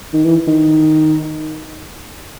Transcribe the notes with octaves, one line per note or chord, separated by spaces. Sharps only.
D#3
E3
D#3